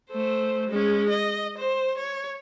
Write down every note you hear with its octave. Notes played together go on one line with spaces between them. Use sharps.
A3 C5
G#3 C#4
D#5
C5
C#5